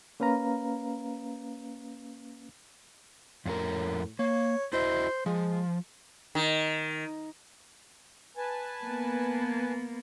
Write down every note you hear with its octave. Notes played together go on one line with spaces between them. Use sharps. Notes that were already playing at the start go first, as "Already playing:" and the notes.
A#3 C#4 B4 F5 A#5
F2 A2 C#4 A#4
A#3 C#5
E4 F#4 C5 D#5
F3 G#3
D#3
B4 G#5 A5
A#3 B3